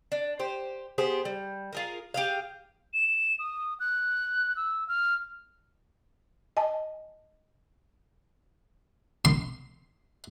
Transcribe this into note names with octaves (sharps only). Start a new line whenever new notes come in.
D4
G4 C5
B3 G4 G#4 C5
G3
F4 G#4 A#4
G4 G#4 F5
E7
D#6
F#6
E6
F6
D#5 G#5 A5
C6